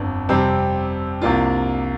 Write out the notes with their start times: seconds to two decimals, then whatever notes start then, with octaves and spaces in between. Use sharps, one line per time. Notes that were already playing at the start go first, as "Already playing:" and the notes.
Already playing: G1 F2 D4
0.29 F2 C3 G3 C4
1.21 C2 C3 A#3 D4 F4